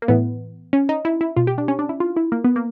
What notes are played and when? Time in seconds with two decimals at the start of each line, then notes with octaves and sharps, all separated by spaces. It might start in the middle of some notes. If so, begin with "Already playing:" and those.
0.02 A#3
0.08 A2 E3 B3
0.73 C#4
0.89 D#4
1.05 E4
1.21 E4
1.36 B2 F4
1.47 G4
1.58 D4
1.68 C#4
1.79 D4
1.89 E4
2.00 F4
2.16 E4
2.32 A#3
2.44 B3
2.56 A#3